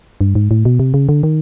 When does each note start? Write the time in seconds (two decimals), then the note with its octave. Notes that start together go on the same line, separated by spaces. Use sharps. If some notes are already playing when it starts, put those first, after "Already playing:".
0.21 G2
0.35 G#2
0.51 A2
0.65 B2
0.79 C3
0.94 C#3
1.09 D3
1.23 D#3